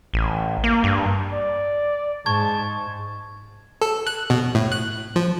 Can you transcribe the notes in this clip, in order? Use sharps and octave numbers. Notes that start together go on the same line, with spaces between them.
A1
A#3
G2
D5
G#2 A5 C#6 G#6
A4
F#6
B2
A2
F#6
F3